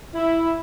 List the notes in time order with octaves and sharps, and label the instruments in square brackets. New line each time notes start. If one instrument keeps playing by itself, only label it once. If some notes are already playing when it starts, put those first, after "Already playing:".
[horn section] E4